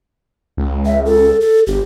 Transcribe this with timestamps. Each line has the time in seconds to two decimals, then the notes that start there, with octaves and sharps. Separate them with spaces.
0.57 C#2
0.86 E5
1.05 A4
1.41 A4
1.67 G1 G4